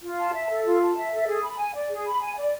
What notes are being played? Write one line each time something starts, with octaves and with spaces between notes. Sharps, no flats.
F4
A5
E5
A4
F4
A5
E5
A4
G#4
B5
G#5
D5
G#4
B5
G#5
D5